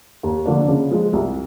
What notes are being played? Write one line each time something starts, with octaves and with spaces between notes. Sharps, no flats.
D#2
D3 F3 A#3 D4
C#3
F3 G#3
C2